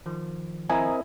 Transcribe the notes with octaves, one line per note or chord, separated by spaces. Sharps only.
D#3 F3
C4 E4 A#4 D#5 G#5 A#5